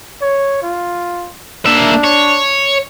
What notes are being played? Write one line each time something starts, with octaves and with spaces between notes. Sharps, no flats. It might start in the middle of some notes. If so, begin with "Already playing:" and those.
C#5
F4
A#3 D4 E5
C#5